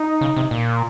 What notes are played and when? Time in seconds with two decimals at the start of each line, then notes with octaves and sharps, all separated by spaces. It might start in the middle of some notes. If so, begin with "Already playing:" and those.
Already playing: D#4
0.21 C#3
0.36 C3
0.51 A#2